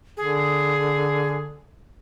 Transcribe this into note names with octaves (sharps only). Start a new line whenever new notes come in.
D3 G#4